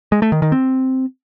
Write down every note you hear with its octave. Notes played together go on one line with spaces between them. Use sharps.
G#3
A3
D#3
D#3
C4